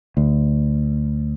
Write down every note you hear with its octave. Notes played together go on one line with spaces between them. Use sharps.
D2